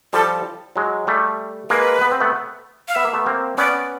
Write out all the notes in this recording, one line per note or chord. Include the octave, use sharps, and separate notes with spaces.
F3 G3 A4
F#3 G#3
G3 A3
G#3 A#3 B4
B3
C4
A3 B3
F5
B3 E5
A#3
A3 B3
A#3 C4
B3 C#4 D5